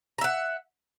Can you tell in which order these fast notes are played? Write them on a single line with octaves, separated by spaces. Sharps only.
A#5 E5 F#5